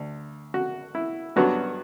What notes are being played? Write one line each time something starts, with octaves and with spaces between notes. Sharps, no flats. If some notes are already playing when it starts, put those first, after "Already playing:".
Already playing: D2
F#4
E4
G2 F#3 B3 D4 F#4